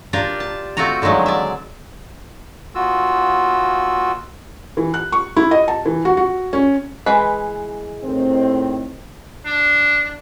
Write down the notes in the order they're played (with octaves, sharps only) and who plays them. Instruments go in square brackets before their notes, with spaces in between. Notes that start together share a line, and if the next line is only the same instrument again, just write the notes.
[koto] D4 F4 G4 A#4 D5
A5
A3 C4 F4 F#4 A#5
D3 D#3 F3 F#3 G#3
D5 E5
[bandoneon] D#2 F4 F#4 E6
[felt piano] E3
F#6
C#6
E4
D#5
A5
E3
F#4
F#4
C#4
[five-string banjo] E3 G#3 B4
[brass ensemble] A2 D#3 C4
[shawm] D4